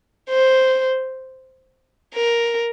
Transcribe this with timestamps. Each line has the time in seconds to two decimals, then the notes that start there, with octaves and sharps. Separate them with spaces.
0.30 C5
2.14 A#4